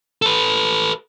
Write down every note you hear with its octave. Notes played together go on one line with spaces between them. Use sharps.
A4 B4